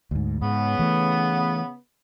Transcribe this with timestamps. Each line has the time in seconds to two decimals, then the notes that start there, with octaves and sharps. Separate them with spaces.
0.11 D2 G#2
0.42 G#2 C#3 B3
0.79 E3 A3